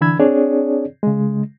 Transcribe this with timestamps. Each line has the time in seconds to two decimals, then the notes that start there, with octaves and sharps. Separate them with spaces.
0.01 D3 E3 D4 B5 E6 G#6
0.20 C4 D4 G#4 C#5 D5
1.03 C#3 G#3